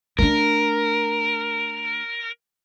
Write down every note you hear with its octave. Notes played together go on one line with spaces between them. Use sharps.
A3 D4 A#4